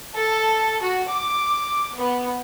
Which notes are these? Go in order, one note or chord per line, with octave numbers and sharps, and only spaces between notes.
A4
F#4
D6
B3